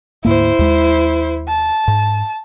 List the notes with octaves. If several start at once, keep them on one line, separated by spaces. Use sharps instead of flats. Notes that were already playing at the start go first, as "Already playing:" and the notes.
D2 G#2 A#3 E4 C5
D#2 G#3
A5
G#2